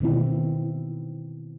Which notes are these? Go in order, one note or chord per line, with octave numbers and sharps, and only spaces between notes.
B2 D#3 C4 E4